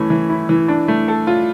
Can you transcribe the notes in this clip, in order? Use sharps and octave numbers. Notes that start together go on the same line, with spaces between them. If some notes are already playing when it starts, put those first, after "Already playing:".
Already playing: E3 A3 C#4
E3
E4
E3
D4
A3
A4
F4